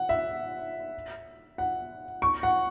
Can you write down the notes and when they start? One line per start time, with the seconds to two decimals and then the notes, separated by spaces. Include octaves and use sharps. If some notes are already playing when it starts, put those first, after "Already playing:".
Already playing: F#5
0.09 E5
1.58 F#5
2.22 C#6
2.43 F#5